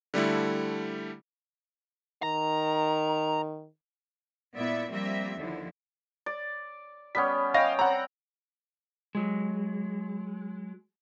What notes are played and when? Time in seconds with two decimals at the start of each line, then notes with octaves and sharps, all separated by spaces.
0.14 D3 G3 A3 E4
2.23 D#3 A#5
4.54 A#2 B3 E4 D5 E5
4.90 F3 G3 A#3 C4 G4 E5
5.38 D#2 D3 F3 E4
6.26 D5
7.15 G3 B3 C#4 B6
7.54 C#5 D#5 F5 G5 A#6
7.79 C4 F#5 A#5
9.15 F#3 G#3